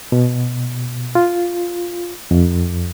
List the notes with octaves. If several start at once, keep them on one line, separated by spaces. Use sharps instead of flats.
B2
F4
F2